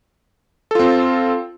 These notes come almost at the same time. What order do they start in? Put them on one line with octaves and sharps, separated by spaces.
A4 F4 C4